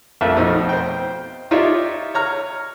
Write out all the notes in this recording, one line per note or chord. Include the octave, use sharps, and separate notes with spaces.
A#1 F2 A3 E5
F2 B2 F3 A3 D#4
C5 G5
D#4 F4 G4 C#5 D5 E5
C#5 A#5 F6